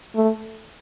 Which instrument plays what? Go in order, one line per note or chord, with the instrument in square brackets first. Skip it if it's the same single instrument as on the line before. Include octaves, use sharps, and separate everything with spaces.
[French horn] A3